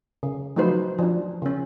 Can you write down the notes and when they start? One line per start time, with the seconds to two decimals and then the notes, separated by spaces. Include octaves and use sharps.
0.23 C#3
0.56 F3 F#3 A3 D#4 B4 C5
0.99 F3 D4
1.42 C#3 C#4